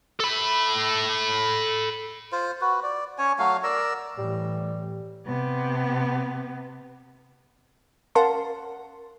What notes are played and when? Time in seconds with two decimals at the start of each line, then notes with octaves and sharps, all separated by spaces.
0.20 A4 B5
2.32 F4 C5
2.61 F#4 B4
2.83 D5
3.18 C#4 C#5 G#5
3.39 F#3 A3 F#4 F5
3.64 A#4 D5 A#5 E6
4.18 A2 E3 G3
5.26 C3 B3
8.15 C#4 A#4 F5 F#5 A5 C6